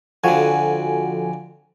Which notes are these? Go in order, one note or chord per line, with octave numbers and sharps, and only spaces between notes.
F2 D3 F3 F#4 G#5